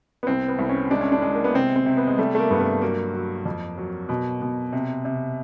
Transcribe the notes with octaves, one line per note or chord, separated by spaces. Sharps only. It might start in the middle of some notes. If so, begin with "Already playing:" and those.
B3
C2 C4
B3
C2
C#4
G#3 D4
C#4
D4
G#3
A#3
B3
C3 C4
C4
C3
B3
G#3
G3 A3
A3
A#3
G2 B3
A#3
F#3 A#3
F#3
F2
F#3
B2
B2
C3
C3